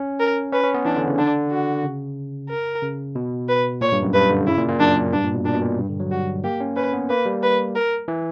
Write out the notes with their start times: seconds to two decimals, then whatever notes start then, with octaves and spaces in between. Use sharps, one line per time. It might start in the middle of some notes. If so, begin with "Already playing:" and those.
Already playing: C#4
0.20 A#4
0.52 C#4 B4
0.64 C#4
0.74 B3
0.85 E3 D4
0.96 D3
1.07 C#3
1.18 D3 D4
1.51 F#4
1.84 C#3
2.49 A#4
2.82 C#3
3.15 B2
3.48 B4
3.81 A#2 C#5
3.92 G2
4.03 F#2
4.13 G2 B4
4.30 D3
4.47 C#3 E4
4.57 A#2
4.68 A#2
4.79 F#2 D4
5.13 G2 D4
5.23 A#2
5.34 B2
5.45 A#2 D4
5.54 B2
5.61 A#2
5.79 G2
5.89 D3
6.00 F#3
6.11 G3 F#4
6.44 A#3 G4
6.61 C#4
6.76 C#4 B4
6.93 B3
7.10 A#3 B4
7.26 G3
7.43 B4
7.75 A#4
8.08 E3